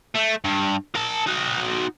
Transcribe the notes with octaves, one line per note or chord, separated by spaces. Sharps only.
A3
G2
A#4 A5
D#4 F#4